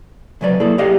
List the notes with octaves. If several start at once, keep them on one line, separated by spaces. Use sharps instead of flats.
C#2 C3 F#3 B4 D5
A#3 E4 G#4 A4
G4 G#4 D5 D#5 F5